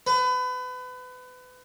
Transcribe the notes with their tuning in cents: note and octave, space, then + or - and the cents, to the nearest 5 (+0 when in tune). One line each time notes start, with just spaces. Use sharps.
B4 +30